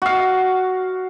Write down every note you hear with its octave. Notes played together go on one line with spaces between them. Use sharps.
F#4 F5